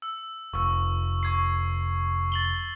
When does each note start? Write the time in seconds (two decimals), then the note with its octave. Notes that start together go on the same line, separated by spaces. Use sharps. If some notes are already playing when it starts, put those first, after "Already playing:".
0.02 E6
0.53 F1 C#6 E6
1.23 C#6 G#6 C7
2.32 A6 F#7 G7